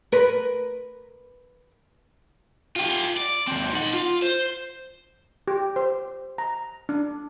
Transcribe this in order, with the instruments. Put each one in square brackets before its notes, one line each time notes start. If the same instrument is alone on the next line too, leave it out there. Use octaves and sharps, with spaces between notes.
[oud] A#4 B4
[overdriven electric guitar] F4 G4
D5
D#2 C4
D#4 F#5
F4
C5
[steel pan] G4
C5
A#5
D4